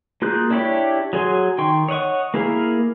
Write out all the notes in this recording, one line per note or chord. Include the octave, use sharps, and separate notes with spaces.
A#3 F4 G#4 F#6 G6
D4 E4 G4 C#5 B5
F#3 G#4 G#5 C6
D#3 G5 C6 C#6
C#5 D#5 F#5 C#6
A#3 E4 G#4 A#4 F5